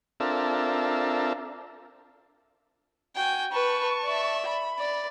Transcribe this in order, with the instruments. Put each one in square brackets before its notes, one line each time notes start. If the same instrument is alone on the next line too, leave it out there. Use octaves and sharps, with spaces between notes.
[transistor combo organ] C4 D4 F4 A4 A#4 E5
[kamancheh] F#4 G#5 [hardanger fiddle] G5
[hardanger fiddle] B4 [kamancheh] A5 C#6
[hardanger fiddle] D5 E5
[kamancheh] B5
[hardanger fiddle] D5